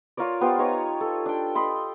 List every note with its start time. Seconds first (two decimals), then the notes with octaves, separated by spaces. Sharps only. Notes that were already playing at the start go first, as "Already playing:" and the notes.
0.17 F4 A#4 C#5 D5
0.41 B3 F4 G4 C5
0.58 D#4 B4 C#5 A#5
1.00 A4
1.26 D4 G5
1.55 D#5 B5 C6